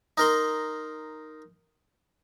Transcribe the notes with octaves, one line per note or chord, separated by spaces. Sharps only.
D#4 A#4 C6